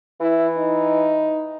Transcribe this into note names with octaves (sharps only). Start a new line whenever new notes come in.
E3 E4
D#4